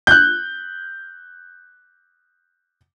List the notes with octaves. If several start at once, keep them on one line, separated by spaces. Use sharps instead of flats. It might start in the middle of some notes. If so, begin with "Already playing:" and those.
F#6 G6